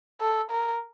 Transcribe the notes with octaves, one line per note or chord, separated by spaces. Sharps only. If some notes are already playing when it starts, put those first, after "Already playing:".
A4
A#4